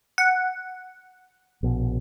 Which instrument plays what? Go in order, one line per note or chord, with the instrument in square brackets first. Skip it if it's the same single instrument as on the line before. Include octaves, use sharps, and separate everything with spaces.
[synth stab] F#5
[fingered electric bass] A#1 B2